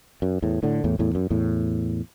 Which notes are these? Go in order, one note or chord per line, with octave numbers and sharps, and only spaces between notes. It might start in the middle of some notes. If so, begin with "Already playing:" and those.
F#2
E2 A2
A2 D3
E2 A2
E2 A2
F#2
E2 A2